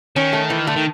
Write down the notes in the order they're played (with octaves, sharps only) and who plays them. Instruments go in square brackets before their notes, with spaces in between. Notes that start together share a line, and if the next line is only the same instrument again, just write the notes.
[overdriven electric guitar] D#3 [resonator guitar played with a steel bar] C#4
[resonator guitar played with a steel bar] A3
E3
[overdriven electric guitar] D3 [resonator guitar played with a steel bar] A3
[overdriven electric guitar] D#3